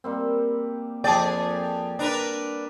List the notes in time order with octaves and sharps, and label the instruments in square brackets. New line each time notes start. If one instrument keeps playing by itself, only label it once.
[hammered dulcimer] G3 A#3 C4
[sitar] F2 G#4 D5 [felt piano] G5 A5
[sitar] D4 A#4 B4